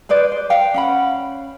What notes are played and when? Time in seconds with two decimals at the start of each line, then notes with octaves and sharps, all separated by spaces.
0.09 G#4 B4 C5 D5
0.32 C5
0.50 F5 G5
0.74 C#4 F#5 B5